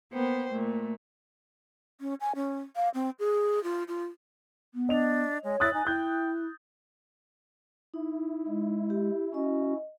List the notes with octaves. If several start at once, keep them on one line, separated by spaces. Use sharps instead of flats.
A#3 B3 C5 G5
A#2 A3
C#4
G#5
C#4
F5
C4
G#4
F4
F4
B3
D4 D#5 F7
G#3 C#5
E4 D#6 F#6 A6
D#4 G#5
E4 G5 G6
D#4 E4
G#3
G4
C#4 F#4 D#5